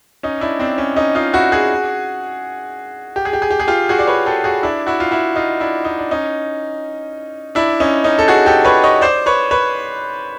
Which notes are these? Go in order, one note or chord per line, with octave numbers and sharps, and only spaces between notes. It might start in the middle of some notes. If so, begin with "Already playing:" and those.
C#4 D#4
D4 E4
C4 D4
C#4
C#4 D#4
D#4 F4
E4 F#4
F#4 G#4
G4
G#4
G4
G#4
G4
G#4
F4 G4
F#4 G#4
D5
B4 C#5
G4 A4
F#4 G#4
D4 E4
E4 F#4
F4
E4 F#4
D#4 F4
D4 E4
D#4
D4
C#4 D#4
D4 E4
C#4 D#4
C#4 D#4
A4
F#4 G#4
G4 A4
B4 C#5
C#5 D#5
C5 D5
B4 C#5
B4 C#5